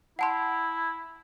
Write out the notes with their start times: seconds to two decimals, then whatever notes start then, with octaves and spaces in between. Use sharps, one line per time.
0.19 E4 F#5 A5 C6